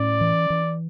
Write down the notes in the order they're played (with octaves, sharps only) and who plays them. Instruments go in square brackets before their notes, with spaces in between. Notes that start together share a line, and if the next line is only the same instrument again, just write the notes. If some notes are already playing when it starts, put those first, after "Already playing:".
Already playing: [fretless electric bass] A2 C#4 [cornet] D5
[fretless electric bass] E3
E3